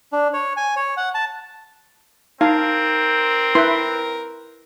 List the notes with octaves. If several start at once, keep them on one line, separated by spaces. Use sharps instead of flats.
D4
C#5
G#5
C#5
F#5
A5
C4 D#4 A#4 F5
E4 B4 C6